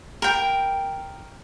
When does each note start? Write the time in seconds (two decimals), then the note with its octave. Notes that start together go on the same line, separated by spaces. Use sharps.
0.22 A#4 G5